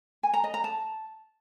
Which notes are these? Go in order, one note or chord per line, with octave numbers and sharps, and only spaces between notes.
G#5
A#5
D#5
A#5
A5